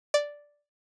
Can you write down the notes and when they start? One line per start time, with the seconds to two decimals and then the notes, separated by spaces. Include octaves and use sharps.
0.14 D5